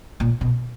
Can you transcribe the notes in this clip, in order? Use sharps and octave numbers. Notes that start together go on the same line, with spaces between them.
A#2
B2